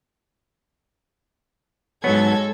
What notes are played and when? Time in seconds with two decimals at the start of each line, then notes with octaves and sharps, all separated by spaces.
2.04 G#2 F#3 G#3 B3 F#4 A4 C#5 G#6